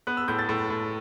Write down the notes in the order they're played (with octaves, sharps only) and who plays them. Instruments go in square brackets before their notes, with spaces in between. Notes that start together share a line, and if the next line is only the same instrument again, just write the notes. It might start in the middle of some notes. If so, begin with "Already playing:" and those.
[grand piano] B3 F#6
E6
A2 G6
A6
A2
A2